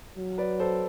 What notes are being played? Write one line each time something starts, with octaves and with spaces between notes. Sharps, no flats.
F#3
B4 D5
A4 C5